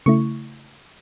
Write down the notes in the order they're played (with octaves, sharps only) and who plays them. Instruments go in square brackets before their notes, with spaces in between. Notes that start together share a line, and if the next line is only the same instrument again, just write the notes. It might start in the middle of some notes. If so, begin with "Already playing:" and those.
[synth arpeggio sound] C#3 A3 E4 C#6